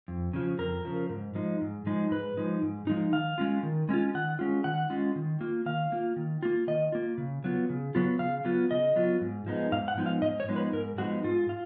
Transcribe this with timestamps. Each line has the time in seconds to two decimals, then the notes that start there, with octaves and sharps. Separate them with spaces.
0.08 F2
0.33 C#3 F3
0.59 F2 A#4
0.85 C#3 F3
1.09 G#2
1.35 F3 G#3 D#4
1.61 G#2
1.86 F3 G#3 D#4
2.11 G#2 B4
2.37 F3 G#3 D#4
2.62 G#2
2.87 F3 G#3 D#4
3.12 D#3 F5
3.38 G#3 C#4 F4
3.63 D#3
3.89 G#3 C#4 F4
4.15 D#3 F#5
4.39 G#3 C#4 F4
4.64 D#3 F#5
4.90 G#3 C#4 F4
5.16 D#3
5.41 A#3 F4
5.66 D#3 F5
5.92 A#3 F4
6.16 D#3
6.43 A#3 F4
6.67 D#3 D#5
6.92 A#3 F4
7.18 C#3
7.44 F#3 B3 F4
7.70 C#3
7.95 F#3 B3 F4
8.19 C#3 F5
8.45 F#3 B3 F4
8.71 C#3 D#5
8.96 F#3 B3 F4
9.21 G#2
9.46 F3 G#3 B3 D#4
9.72 G#2 F5
9.88 F#5
9.98 F3 G#3 B3 D#4
10.06 F5
10.22 G#2 D#5
10.40 C#5
10.48 F3 G#3 B3 D#4
10.56 B4
10.72 G#2 A#4
10.98 F3 G#3 B3 D#4 F#4
11.24 G#2 F4
11.49 F4